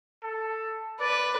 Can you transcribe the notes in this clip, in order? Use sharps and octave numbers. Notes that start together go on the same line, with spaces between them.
A4
B4 D5